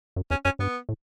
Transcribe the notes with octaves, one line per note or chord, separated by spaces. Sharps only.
F#2
E2 C#4
F#2 C#4
G2 B3
A2